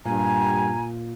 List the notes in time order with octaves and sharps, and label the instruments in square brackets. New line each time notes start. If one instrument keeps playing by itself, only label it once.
[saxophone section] G2 [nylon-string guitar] A#2 [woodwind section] G#5 [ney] A#5